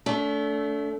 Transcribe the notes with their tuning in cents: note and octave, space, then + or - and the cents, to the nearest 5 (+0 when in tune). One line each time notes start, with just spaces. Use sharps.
A3 +0 D4 -40